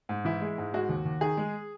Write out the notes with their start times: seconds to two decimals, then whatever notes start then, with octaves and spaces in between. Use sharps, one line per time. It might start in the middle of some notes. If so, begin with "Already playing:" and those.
0.09 G#2
0.25 E3 E4
0.42 G#3
0.58 G#2
0.74 G#3 F#4
0.89 D#2
1.05 D#2
1.21 D#3 G#4
1.37 G#3